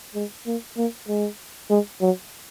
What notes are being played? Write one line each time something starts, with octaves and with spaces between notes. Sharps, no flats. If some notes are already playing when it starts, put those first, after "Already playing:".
G#3
A#3
A#3
G#3
G#3
F#3